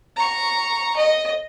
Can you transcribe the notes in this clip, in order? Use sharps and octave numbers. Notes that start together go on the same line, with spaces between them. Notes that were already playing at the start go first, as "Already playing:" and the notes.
A#5 C#6
D#5